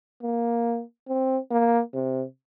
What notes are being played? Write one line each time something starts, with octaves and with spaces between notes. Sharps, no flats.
A#3
C4
A#3
C3